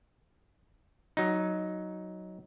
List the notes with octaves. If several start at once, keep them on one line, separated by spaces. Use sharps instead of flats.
F#3 D#4